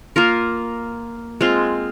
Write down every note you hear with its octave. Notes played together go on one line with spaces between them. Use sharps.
A#3 F4 A#4
G#3 C4 F4